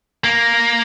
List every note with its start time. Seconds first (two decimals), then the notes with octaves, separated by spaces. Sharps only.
0.24 A#3